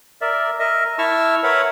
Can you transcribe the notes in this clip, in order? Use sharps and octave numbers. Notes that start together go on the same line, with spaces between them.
A#4 D5 E5
A#4 D#5 E5
E4 E5 A5 C#6 E6 F6
A#4 B4 C#5 E5 F#5 B5